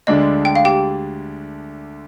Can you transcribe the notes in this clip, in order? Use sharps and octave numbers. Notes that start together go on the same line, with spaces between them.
D2 D3 G#3 D4 D#5
G5
F5
G4 G5